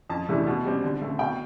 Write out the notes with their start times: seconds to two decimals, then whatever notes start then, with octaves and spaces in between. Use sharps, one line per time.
0.10 F2 A5
0.29 C3 E3 A3 D4
0.47 B2
0.65 G3 C4
0.84 D3
1.01 A3 C4
1.19 B2 G5